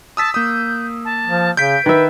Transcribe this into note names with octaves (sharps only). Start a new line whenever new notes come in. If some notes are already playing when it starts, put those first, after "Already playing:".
A5 D#6 E6 B6
A#3 D#6 G6
A5
F3
C#3 G6 B6 D7
D#3 B4 E5